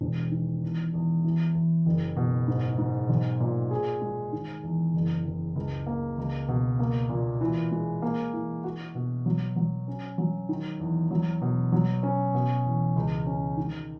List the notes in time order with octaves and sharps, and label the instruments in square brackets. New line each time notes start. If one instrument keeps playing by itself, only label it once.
[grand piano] E1
D#3
E2
E2
E3
E2
F#1
B2
G#2
G#2
B1
A#2
G#4
G#3
D#3
E2
F#1
F#1
C#2
A#3
C#2
B2
A#3
A#2
E3
G#3
A#3
E3
F#4
B2
F#3
F#3
C#4
F#3
D#3
E2
F#3
B2
F#3
C#4
B2
E2
C#2
C#4
D#3